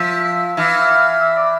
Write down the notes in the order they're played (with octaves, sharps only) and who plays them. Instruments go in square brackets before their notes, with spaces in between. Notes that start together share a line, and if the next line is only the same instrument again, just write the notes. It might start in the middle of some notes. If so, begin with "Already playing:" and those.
Already playing: [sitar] F3 [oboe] E5
[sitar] E3 [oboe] F5
[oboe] E5
D5